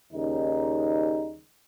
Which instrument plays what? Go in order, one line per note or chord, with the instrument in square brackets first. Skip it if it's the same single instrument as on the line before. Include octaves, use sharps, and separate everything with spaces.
[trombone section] D#2 C#3 G3 C#4 D#4